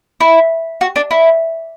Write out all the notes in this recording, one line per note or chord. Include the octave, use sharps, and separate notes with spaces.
E4
F#4
D4
E4